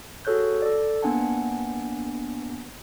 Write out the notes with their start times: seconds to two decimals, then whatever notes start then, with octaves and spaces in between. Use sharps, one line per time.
0.25 F#4 G#4 A4 C#5 F#6 G6
0.62 A4 D5
1.03 A#3 B3 D4 F#5 G#5 A5